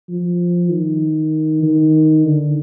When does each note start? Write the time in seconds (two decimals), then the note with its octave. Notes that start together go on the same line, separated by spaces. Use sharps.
0.09 F3
0.71 D#3
1.63 D#3
2.25 D3